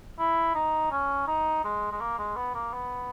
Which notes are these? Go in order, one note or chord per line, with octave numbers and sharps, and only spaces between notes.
E4
D#4
C#4
D#4
G#3
G#3
A#3
G#3
B3
A#3
B3